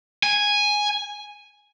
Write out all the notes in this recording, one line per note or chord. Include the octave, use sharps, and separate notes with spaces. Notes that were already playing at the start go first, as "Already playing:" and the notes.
G#5